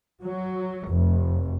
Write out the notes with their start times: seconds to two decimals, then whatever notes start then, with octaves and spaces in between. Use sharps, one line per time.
0.23 F#3
0.88 F1